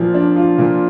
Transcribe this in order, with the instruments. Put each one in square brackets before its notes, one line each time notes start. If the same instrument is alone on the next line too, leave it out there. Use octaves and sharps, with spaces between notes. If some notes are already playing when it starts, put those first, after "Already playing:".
Already playing: [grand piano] A#2 F3
D4
F4
A#2